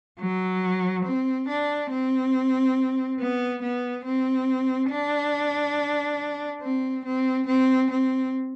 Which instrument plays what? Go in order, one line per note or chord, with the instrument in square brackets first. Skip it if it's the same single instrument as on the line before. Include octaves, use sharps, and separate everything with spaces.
[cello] F#3
C4
D4
C4
B3
B3
C4
D4
C4
C4
C4
C4